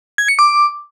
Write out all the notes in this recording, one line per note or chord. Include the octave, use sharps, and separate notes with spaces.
G#6
C#7
D6